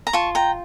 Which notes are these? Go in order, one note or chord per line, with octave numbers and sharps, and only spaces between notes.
A#5
F4 A5 C#6
G5 A#5